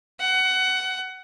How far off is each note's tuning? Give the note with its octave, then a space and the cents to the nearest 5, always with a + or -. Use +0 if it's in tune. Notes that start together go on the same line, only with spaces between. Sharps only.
F#5 +20